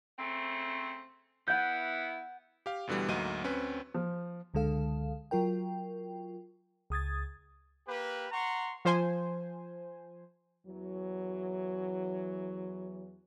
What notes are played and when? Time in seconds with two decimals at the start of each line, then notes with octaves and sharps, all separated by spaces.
0.18 C#3 A3 C4
1.48 B3 E4 F#5 G6
2.66 G4 F5
2.87 D2 B2 D3 E3 G3
3.08 D2 G#2 F#3 A#3 D#5 D#7
3.44 D2 C4 C#4 B4
3.94 F3
4.54 C#2 D3 G#3 A4 F5
5.31 F#3 F4 A#4 G5
6.90 C#2 D#6 G#6 A6
7.86 A#3 G4 B4
8.31 F#5 A#5 C6 C#6
8.85 F3 C5 G#5
10.67 E2 E3 F#3